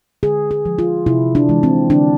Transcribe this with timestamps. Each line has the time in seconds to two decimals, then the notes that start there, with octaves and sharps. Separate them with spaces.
0.23 D3 G#4
0.51 G#4
0.65 F3 G#3
0.79 F4
1.06 C3 E4
1.35 D4
1.49 E3 G#3
1.63 C4
1.90 D3 D4